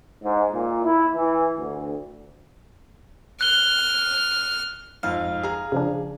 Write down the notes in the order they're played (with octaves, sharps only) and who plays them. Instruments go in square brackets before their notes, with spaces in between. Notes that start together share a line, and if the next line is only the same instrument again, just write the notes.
[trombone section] G#2
A#2
E4
E3
D2
[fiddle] F6 [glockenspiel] F#6 G7
[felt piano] F2 G#2 [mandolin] F5
[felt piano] G#4 A#5
[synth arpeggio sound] C#3 F3 D4